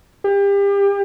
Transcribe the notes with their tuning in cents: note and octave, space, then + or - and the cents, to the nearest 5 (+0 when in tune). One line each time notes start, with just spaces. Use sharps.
G4 +30